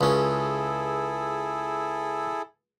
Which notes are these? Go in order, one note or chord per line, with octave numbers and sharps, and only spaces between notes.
C#2 C#4 E4 G#4 A4